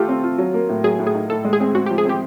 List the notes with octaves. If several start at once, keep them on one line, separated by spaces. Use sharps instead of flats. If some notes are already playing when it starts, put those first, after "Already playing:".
Already playing: A3 F4 G4 A4
C4
F4
F#3
A#3
A2
F#3 G#4
A2
G#4
D#4
A2 A4
G#3
G#4
C4
C4 F#4
F3 G4
G#4
C4 G4